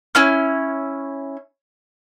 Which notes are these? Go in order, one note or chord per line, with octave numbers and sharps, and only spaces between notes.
C#4 E4 F6